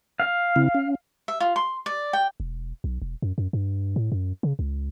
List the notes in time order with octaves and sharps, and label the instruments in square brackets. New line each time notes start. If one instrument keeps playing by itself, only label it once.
[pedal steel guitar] F5
[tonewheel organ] C#3 C4 E4
C#4
[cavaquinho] E5
F4
C6
D5
G5
[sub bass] E1
B1
E1
F#2
F#2
G2
A2
F#2
C#3
C#2